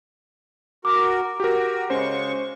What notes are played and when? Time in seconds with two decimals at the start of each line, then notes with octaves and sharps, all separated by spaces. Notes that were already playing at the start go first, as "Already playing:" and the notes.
0.85 F#4 A#4 D6
1.40 F#4 G4 A#4
1.90 C#3 G#3 C#4 C5 C#6